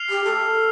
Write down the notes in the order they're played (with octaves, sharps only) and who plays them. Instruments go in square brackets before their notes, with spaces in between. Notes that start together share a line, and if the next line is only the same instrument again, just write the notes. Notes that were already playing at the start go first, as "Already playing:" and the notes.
Already playing: [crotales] F6 C7 F7
[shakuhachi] G4
A4